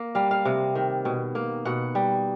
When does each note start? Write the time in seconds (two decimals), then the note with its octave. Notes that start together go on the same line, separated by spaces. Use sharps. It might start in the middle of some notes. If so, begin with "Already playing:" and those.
Already playing: A#3
0.15 G3 F5
0.31 F5
0.45 C3
0.75 D#3
1.05 B2
1.35 A#3
1.65 B2 F#5
1.95 G3